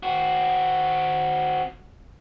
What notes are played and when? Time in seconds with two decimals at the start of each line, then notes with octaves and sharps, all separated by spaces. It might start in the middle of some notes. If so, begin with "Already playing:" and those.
0.03 C4 F#4